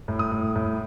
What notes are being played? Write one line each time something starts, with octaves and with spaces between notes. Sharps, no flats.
A2
D#6
A2
A2